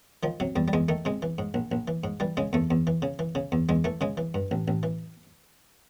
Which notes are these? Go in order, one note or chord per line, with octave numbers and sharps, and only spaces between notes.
D#3 F3
C3 F#3
E2 G3
G3
E2 G#3
D#3 A3
C3 G#3
E3
G#2
A#1
A#1
E3
G#2
E3 G3
C#3 G#3
E2 A3
E2
E3
C#3
E3
C#3
E2
E2 G#3
E3 A3
C#3 G#3
E3
G2
A1
A1
E3